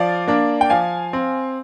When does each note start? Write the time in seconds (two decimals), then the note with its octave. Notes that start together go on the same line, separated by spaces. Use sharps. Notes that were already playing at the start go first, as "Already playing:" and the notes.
Already playing: F3 D5 F5
0.27 A#3 D4
0.61 G5
0.70 F3 F5 G#5
1.13 C4